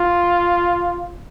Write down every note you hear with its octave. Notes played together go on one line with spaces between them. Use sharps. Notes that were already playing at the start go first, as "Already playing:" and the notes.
Already playing: F4